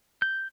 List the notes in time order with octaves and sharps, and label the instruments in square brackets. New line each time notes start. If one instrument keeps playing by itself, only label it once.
[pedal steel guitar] G6